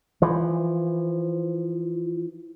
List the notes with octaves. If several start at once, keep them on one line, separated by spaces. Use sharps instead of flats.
E3 F3